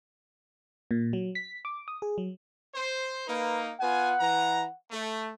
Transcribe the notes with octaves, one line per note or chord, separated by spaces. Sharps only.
A#2
F#3
B6
D6
D#6
G#4
F#3
C5
A#3 D#4 B4
B3 F4 F#5 G#5
E3 A#5
A3